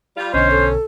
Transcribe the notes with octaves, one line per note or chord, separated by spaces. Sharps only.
G3 F4
B1 B2 D3 C#4 C5 D#5
A4